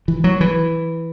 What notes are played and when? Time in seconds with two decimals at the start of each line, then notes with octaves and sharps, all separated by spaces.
0.08 E3
0.24 F#3
0.41 E3